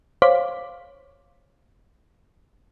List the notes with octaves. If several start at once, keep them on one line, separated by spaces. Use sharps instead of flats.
C5 C#5 F5 D6 B6